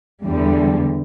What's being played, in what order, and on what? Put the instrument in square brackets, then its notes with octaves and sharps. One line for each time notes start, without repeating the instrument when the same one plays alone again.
[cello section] E2 D3 G3